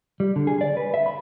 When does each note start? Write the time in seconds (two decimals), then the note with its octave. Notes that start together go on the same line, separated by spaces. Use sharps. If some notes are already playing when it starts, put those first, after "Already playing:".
0.20 G3
0.36 D3
0.47 G#4
0.61 D5
0.77 B4
0.94 E5
1.06 B5